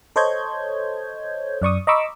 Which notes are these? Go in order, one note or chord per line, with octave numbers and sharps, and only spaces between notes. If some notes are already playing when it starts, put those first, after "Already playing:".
A4 C5 C#5 D#5 G6 G#6
F#2 D5 C#6 D#6
D#5 A#5 B5 C#6 D6 E6